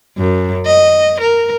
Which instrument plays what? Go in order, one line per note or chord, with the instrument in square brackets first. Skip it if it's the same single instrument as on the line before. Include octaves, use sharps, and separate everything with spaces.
[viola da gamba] F#2
D#5
A#4